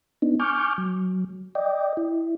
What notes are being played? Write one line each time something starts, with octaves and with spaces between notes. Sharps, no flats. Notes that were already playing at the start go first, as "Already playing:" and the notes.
B3 D4 D#4
G#5 C#6 D6 F6 G6
F#3
D5 D#5 G5
E4